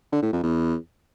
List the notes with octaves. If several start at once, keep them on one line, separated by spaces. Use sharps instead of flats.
D3
A2
F2
E2